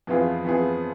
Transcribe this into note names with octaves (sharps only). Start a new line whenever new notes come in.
F2 E3 B3 F4 G#4
F2 E3 B3 F4 G#4